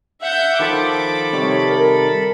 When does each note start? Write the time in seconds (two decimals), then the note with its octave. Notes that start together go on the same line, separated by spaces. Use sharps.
0.22 E5 F#5 G6
0.60 D#3 F3 F4 A4 B5 D6
1.33 C3 D#3 G3 C#5
1.69 A#4